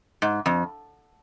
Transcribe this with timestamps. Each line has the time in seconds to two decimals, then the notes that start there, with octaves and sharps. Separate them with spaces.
0.22 G#2
0.46 F2